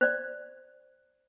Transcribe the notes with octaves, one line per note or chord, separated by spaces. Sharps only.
C5 D5